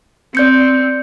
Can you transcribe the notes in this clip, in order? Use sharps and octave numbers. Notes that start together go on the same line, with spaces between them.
C4 D5 G6 C#7